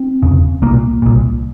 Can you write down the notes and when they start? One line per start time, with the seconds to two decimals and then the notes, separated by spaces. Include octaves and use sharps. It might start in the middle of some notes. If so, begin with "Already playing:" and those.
Already playing: C4
0.23 F1 E2 C#3
0.62 C2 A#2 A#3
1.02 C2 A#2